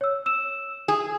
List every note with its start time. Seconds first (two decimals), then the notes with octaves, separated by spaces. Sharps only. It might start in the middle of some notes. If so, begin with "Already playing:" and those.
0.01 C#5 E6
0.26 E6 E7
0.88 G#4